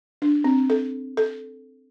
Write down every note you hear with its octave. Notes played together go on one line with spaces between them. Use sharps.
D4
C4
A4
A4